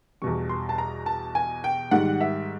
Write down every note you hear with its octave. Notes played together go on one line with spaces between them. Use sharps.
E2 B2 G3 C#6
C6
A5
A#5
A5
G#5
G5
G#2 D#3 G3 F#5
E5